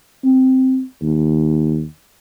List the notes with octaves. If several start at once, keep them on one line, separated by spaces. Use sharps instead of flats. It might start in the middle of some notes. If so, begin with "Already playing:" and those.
C4
D#2